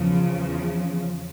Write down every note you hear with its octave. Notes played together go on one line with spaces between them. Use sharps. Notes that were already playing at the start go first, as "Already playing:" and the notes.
Already playing: E2 C#3 F3